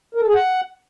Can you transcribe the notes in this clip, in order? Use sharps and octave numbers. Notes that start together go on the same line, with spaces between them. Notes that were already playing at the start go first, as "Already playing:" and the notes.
A#4
A4
G#4
F#5